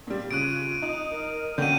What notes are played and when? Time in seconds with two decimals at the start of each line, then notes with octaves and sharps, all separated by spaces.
0.07 A#2 G3
0.31 C#3 F4 F#6 D7 D#7
0.82 D#4
1.11 A#4
1.58 D3 A#3 C#4 F#4 G5 G6 D#7